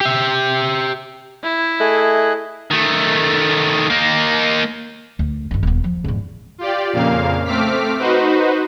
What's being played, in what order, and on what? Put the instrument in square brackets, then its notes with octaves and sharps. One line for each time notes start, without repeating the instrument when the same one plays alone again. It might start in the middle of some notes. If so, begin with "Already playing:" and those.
[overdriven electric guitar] G4 E5
[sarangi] E4
[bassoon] A3 [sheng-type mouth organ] G#4 D#5 F#6
[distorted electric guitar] D#3 A3
A#3 D#4
[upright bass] D2
G2 D#3
D#1 B3
F3
E2 G#2
[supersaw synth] F4 G4 D5
F2 A#2 C#3 A#3 F5
A3 C4 D6 F6 B6
D#4 F#4 B4 C5